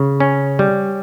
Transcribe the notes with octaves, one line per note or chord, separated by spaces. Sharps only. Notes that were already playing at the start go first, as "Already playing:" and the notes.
Already playing: C#3
C#4
G3